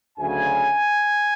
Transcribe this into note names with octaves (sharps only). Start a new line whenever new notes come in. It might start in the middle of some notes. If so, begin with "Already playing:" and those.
D2 C#3 F#3 A3 G#5